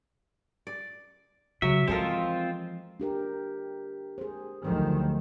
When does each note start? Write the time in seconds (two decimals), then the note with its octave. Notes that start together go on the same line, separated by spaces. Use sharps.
0.67 D5
1.62 C#3 F#3 E5
1.88 E3 F3 G#3 C4 F4 A4 A#4
3.00 D4 G4 A#4
4.18 G#4 C5
4.64 D2 D#3 F3 F#3 C5